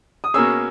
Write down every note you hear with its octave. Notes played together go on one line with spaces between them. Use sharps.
D#6
B2 A#3 C#4 G#4 E6